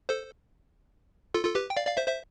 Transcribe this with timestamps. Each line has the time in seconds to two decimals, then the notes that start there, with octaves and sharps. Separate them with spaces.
0.09 A4 C5
1.34 F4 A4
1.44 F4 A4
1.55 G4 B4
1.70 G5
1.76 D5 F5
1.87 D5 F5
1.97 C5 E5
2.07 C5 E5